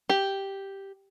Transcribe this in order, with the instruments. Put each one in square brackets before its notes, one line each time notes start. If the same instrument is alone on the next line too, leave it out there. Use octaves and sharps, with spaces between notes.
[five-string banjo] G4